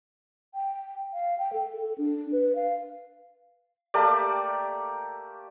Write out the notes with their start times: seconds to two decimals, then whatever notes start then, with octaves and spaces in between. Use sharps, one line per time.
0.54 G5
1.13 F5
1.38 G5
1.53 A4
1.76 A4
1.98 D4
2.32 B4
2.55 F5
3.94 A3 A#3 G4 D5